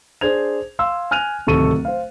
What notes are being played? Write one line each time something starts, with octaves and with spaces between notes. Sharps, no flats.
D4 G#4 C5 G#6 F7
F5 C6 E6
G#5 F6 F#6 D#7 F7
D1 C3 D#3 A4 C#6 D#7
C5 F5